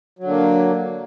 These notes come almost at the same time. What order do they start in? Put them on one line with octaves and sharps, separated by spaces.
F#3 D3 A#3